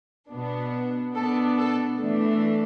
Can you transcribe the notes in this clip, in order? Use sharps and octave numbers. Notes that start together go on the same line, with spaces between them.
B2 B3 D4
B2 B3 D4 A4
A4
E3 A3 D4 A4